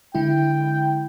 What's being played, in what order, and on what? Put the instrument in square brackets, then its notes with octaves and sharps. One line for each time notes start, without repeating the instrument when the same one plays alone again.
[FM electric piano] D3 G#3 E4 [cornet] G5